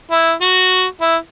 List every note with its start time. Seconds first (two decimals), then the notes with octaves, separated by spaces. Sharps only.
0.11 E4
0.42 F#4
1.01 E4